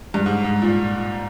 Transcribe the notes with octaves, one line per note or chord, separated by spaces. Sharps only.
G2
G#2
G#2
A#2